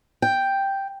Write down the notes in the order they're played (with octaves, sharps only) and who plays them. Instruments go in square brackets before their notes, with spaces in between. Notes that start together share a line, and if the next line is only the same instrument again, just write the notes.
[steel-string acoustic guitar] G5